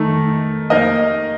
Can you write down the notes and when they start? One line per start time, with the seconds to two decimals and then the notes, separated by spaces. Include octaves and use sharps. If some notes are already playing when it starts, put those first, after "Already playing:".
Already playing: D#3 A3 D#4
0.70 A#3 D#4 A#4 D#5